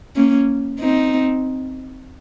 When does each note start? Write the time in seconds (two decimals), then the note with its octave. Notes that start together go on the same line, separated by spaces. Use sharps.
0.16 A#3 C#4
0.80 C4 D#4